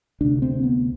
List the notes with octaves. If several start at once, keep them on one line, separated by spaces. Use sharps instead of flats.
D2 C3 D4
C4
B3